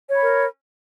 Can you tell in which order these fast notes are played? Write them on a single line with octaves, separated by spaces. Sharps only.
C#5 B5 A#4